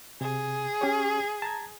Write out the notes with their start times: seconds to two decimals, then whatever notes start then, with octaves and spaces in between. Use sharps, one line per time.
0.21 C3 G#4
0.81 C#4 G4 C#5
1.42 A5 A#5 G#6